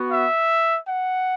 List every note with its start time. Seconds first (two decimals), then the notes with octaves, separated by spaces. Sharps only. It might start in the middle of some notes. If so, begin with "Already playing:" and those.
Already playing: B3 F#4
0.10 E5
0.86 F#5